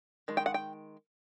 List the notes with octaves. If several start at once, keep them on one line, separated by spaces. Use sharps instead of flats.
D#3 G#3
G5
F#5
G5